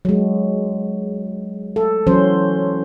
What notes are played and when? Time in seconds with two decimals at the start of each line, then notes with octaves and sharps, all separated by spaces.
0.05 F#3 G#3
1.76 A4
2.07 E3 F#3 C#4 C5